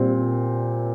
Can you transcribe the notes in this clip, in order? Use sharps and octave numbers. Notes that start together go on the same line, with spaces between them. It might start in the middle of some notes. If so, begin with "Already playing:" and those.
Already playing: A#2 G3 C4